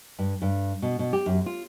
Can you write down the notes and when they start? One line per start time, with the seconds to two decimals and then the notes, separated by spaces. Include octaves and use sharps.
0.19 G2
0.42 G2
0.82 B2
0.99 B2
1.13 G4
1.26 F#2
1.46 F4